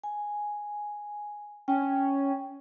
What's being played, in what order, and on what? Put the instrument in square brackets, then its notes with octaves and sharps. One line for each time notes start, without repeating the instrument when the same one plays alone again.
[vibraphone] G#5
[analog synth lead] C#4 [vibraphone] G5